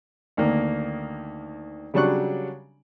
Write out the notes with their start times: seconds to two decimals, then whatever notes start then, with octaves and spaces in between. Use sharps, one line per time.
0.37 D2 D#3 A#3
1.94 C#3 F#3 G3 D4 C#6 F#6